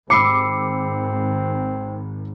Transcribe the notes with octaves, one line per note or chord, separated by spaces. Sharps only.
G#1 C4 B5 D6 E6 C7 C#7